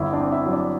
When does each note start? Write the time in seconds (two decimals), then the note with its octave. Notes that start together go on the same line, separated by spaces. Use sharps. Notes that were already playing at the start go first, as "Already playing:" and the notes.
Already playing: G1 E4 E5
0.13 D4 D5
0.20 C4
0.32 E4 E5
0.46 F#3
0.52 D4 D5